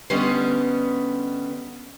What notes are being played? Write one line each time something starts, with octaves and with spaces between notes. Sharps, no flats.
D3 G3 B3 C#4 D#5